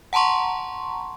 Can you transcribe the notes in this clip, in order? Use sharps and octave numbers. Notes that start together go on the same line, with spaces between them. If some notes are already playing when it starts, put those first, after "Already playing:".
F#5 A5 A#5 C6 C#6